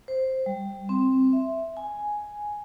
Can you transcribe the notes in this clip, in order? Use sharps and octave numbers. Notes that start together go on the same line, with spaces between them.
C5
G3
C4
E5
G#5